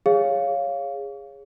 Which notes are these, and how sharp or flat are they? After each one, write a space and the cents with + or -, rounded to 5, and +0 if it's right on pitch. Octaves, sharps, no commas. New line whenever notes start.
G#4 -15 C#5 +0 F5 +0